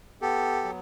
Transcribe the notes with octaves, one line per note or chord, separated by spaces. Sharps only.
B3 G4 A4
F#3